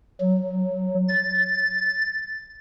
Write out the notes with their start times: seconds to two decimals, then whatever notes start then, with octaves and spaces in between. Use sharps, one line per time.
0.20 F#3
1.08 A6